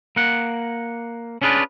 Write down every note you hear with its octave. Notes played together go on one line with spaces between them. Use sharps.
A#3 F#5
C#4 D4 F4 G#4 B4 D5